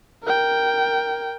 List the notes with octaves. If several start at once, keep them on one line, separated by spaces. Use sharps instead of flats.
A#4 G5